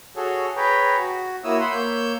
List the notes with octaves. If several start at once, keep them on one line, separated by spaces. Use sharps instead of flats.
F#4 G#4 A4 C#5
G#4 B4 C#5 G5 A#5
F#4
A#3 E4 F#4 C#5 D#6 E6
F#5 B5 C6 E6
A#3 C#5 E6 G6